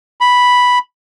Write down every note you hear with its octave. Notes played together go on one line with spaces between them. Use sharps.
B5